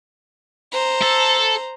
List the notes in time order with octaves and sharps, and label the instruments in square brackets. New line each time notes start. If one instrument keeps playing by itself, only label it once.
[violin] C5 A#5
[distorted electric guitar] A4